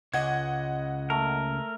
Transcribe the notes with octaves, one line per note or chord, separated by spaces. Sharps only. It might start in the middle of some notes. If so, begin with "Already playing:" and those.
C#2 D#5 F#5 G#6
A3 A#4